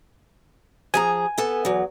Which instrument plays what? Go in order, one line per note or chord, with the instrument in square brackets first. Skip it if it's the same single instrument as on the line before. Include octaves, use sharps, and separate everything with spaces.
[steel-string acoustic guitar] F3 G#4 A#5 [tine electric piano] G#5
[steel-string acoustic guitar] B3 A4
E2 F#3